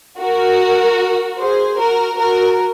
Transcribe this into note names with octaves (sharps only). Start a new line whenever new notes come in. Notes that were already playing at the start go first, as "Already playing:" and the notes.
F#4 A#4
G#4 C5
F#4 A#4
F#4 A#4